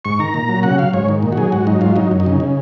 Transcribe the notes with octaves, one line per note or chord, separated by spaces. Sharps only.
G#2 C#6
D#3 A#5
A#2
F#3
C#3 F#5
F#3 F5
G#2 C#5
D#3
A#2
F#4
F#3 G#4
G#2 F#4
F#3 D#4
G#2 F4
F#3 D#4
F#2
D#4
C#3
C#3